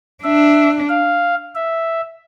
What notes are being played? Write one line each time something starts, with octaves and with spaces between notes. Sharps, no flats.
D4 E5
F5
E5